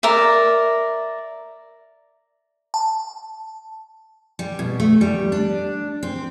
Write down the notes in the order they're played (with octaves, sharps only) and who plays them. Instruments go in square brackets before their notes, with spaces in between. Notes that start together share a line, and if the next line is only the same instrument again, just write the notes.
[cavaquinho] A#4 D5 E5
[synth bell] A5
[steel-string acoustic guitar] G3
B2
A3
G3
D4
C4